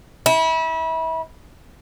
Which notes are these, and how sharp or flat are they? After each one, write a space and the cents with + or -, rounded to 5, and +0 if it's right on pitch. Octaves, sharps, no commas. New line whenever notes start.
E4 -30